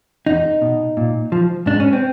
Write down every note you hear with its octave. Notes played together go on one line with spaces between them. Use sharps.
E2 D#4
B2
A#2
F3
G#2 D4
C#4
C4